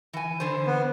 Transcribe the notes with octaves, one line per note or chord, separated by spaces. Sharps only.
E3 G#5
D3 E3 C5
B3